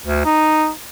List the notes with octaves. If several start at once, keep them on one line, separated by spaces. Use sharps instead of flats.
D2
D#4